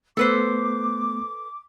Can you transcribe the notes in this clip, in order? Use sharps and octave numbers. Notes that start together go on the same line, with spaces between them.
A3 B3 A4 B4 C5 D6